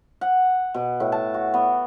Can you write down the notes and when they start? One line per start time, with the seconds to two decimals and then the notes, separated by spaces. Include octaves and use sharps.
0.21 F#5
0.74 B2
1.00 A2
1.12 A5
1.34 F#4
1.54 B3